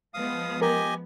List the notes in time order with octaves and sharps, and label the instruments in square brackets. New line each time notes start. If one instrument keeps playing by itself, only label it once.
[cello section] F3 G#3 B3 [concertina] F5 D#6
[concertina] G4 D#5 G#5 [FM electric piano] A#4